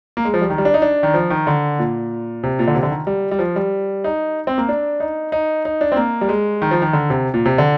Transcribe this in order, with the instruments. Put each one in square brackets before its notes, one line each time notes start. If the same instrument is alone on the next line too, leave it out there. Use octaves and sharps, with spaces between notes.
[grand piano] A#3
G#3
F3
G3
D#3
G3
D4
D#4
D4
D#3
F3
D#3
D3
A#2
C3
A#2
D3
C3
D3
D#3
G3
G3
F3
G3
D#4
C4
A#3
D4
D#4
D#4
D#4
D4
C4
A#3
G3
G#3
D#3
F3
D#3
D3
C3
A#2
C3
D3